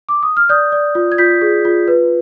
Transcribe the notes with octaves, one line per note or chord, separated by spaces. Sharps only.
D6
D#6
F6
D5 D#6 G6
D5
F4
G#6
F4 G6 B6
G#4
F4
B4